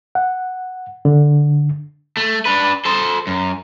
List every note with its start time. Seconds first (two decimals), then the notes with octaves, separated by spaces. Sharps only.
0.15 F#5
1.05 D3
2.17 A3
2.45 D4 B4
2.85 A4 C5
3.27 F#2